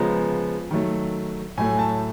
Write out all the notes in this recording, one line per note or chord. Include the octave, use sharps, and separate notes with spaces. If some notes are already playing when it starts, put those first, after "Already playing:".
Already playing: C#3 F3 G#3 B3 A#5
D#3 F#3 A3
A2 F#3 A3 G#5
A5